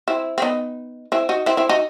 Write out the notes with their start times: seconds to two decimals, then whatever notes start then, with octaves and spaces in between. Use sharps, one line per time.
0.08 C4 E4
0.38 C4
0.42 B3 D#4
1.12 C4 E4
1.29 D#4 F#4
1.46 C4 E4
1.57 C4 E4
1.69 D#4 F#4